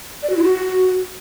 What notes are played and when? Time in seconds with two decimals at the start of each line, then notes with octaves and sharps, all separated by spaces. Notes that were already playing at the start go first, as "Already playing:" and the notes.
0.23 D5
0.30 F#4
0.37 E4
0.44 F#4